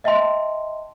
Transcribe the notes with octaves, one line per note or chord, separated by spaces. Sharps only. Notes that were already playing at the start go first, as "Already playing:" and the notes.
D#5 E5 G5 A5 C6